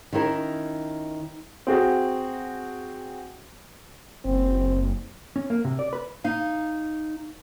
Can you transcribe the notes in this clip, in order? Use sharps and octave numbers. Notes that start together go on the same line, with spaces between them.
D#3 C#4 E4 A#4
C4 F#4 G#4
F#1 C4
C#4
A#3
C3
D5
B4
D#4 F5